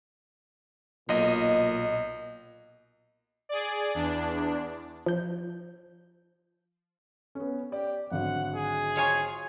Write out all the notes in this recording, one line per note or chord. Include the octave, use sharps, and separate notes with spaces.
B1 A#2 D#5
G#4 D5
E2 D4
F3 G6
B3 C#4
G4 D5
G#1 D3 F#3 F#5
G#4
F4 C#5 G#5